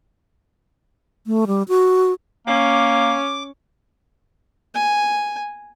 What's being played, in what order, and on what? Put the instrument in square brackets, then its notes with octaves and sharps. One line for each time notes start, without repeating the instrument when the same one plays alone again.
[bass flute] A3
G3
F#4
[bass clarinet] A#3 [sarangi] C#4 [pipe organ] D6
[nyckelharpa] G#5